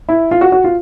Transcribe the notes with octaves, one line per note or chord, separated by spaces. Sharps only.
E4
F4
F#4
F#4
F4